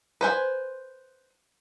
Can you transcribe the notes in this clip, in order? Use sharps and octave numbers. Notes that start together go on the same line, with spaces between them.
B4 C5 G#5